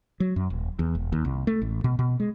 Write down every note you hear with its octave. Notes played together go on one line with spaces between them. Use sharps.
F#3
F#2
D#1
E2
E1
D#2
C2
A3
A1
B2
B2
G#3